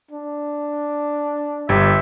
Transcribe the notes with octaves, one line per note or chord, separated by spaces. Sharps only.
D4
G1 G4 E5 G#6